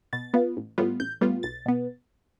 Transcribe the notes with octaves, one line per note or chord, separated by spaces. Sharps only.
B2 A6
B3 F4
A1
A2 G3 B3 F4
A1 G6
A2 G3 B3 F4
B1 A6
B2 B3